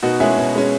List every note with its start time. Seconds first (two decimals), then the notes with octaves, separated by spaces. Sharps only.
0.03 B2 D#4 F#4
0.20 G#3 C#4 E4 G#4
0.38 B2
0.55 G#3 C#4